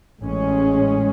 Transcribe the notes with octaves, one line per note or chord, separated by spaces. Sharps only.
A1 G#3 C#4